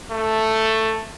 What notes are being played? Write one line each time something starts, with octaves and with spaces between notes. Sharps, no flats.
A3